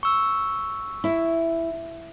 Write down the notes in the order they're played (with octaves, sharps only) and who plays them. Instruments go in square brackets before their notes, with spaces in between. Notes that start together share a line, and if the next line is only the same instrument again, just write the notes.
[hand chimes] C#6 E6
[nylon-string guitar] E4